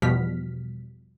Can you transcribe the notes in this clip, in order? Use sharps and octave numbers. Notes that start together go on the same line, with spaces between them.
E2 B2 F3 G3 F6 B6